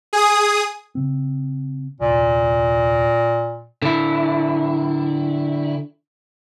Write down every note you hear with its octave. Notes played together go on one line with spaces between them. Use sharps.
G#4 D#6
C#3 C4
D#1 C2 A#2
D3 E4